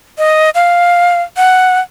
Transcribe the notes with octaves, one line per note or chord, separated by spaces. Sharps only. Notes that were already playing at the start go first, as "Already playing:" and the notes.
D#5
F5
F#5